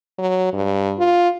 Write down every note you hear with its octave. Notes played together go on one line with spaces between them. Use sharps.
F#3
G2
F4